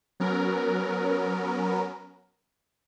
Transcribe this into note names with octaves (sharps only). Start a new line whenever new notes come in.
F#3 B3 C#4 A#4